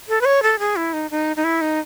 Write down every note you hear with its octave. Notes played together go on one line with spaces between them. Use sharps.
A4
B4
C#5
A4
G#4
E4
D#4
D#4
D#4
E4
D#4